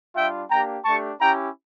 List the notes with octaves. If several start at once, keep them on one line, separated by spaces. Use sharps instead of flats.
G3 D4 F4 E5 G5
A#3 D4 G4 G5 A#5
A3 D4 G4 A5 C#6
C#4 E4 G4 G5 A#5